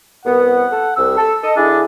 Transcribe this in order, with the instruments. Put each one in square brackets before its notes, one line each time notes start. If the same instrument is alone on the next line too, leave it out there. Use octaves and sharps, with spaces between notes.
[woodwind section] C2 B3 [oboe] F#5
[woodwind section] A4
[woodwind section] C2 [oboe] E6
[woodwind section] A4
A4 D#5
[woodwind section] D3 E4 G#4 [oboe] D4